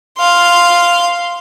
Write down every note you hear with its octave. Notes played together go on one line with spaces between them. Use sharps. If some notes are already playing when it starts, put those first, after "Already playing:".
F5 C6